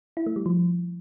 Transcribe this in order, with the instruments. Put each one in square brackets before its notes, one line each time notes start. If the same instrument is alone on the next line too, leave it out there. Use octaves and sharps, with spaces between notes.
[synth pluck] E4
A3
G3
F3